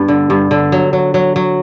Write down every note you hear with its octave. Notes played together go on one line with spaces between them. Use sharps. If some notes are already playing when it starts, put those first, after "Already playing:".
Already playing: G2 B3
D3
G2
D3
F#3
F#3
F#3
F#3